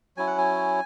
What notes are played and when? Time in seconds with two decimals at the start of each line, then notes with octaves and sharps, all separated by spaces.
0.17 F#3 C#4 E4 G#5
0.27 F#5
0.38 G#5